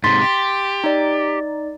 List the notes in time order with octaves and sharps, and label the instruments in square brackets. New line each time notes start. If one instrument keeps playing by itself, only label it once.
[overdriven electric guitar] G#2 C3 [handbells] C6 A6 B6
[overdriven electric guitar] G4
[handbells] D#4 D5